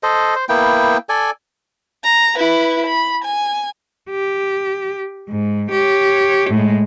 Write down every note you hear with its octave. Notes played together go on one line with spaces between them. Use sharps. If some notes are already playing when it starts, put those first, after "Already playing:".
A4 C5 D#5
C5
A#3 B3 E4 G5
A4 D5 G#5
A#5
E4 B4
B5
G#5
G4
G#2
G4 C#5
A2 G#3